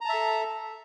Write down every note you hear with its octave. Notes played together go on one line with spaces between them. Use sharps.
A4 E5 A5 A#5